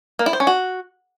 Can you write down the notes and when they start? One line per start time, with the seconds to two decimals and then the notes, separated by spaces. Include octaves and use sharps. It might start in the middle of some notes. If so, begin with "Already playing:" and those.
0.19 A#3
0.26 E4
0.33 C5
0.40 C#4
0.47 F#4